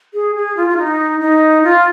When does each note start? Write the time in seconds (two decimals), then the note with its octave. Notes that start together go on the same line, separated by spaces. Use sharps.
0.14 G#4
0.36 G#4
0.57 F4
0.69 F4
0.77 D#4
1.20 D#4
1.64 F4